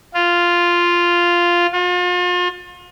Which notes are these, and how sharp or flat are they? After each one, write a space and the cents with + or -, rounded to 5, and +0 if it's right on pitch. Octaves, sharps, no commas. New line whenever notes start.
F4 -5
F4 +40